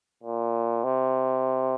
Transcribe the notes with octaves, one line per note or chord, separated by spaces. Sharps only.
A#2
C3